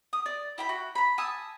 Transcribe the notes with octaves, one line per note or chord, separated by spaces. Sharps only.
D#6
D5
E4 G5 B5
F#4
A#5 B5
G#5 A5 D#6 E6